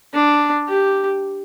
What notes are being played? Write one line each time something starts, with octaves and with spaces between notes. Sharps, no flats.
D4
G4